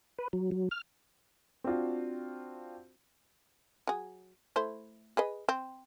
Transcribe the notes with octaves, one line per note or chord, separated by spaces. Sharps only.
B4
F#3
F#3
F6
C4 D4 F4 F#4
F#3 G#4
A3 E4 C5
G#4 B4 D#5
C4